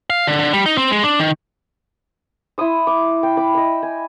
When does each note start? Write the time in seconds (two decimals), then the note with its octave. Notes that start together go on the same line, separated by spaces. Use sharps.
0.10 F5
0.27 D3
0.40 D3
0.53 G3
0.66 D#4
0.78 C4
0.91 G#3
1.03 D4
1.20 D#3
2.58 E4 C6 D#6 E6
2.87 D6
3.23 G5
3.37 B5 D6
3.55 D#5 E6
3.83 G#5